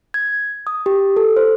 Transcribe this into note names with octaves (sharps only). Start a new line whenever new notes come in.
G#6
D#6
G4
A4
C5